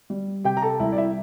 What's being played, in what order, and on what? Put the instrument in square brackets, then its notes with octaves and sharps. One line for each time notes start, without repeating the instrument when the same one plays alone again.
[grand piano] G3
C3 G4 G5
A#5
A4 A5
C2 E4 E5
D5
E4 E5